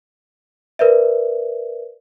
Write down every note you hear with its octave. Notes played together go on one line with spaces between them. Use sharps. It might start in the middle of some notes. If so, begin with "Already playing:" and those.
A#4 B4 D5 E5